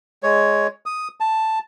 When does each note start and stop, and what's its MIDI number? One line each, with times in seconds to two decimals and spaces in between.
0.23 0.67 56
0.23 0.67 73
0.86 1.08 87
1.20 1.59 81